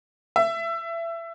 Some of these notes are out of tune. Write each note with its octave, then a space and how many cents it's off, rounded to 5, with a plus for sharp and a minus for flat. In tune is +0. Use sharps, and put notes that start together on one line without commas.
E5 +25